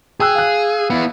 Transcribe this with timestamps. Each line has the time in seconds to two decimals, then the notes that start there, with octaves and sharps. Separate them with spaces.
0.20 G#4 G5 E6 F#6
0.35 F5 F#6
0.90 B3 E4